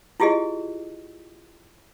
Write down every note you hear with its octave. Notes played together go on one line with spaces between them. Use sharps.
E4 F4 G4 G#4 D#5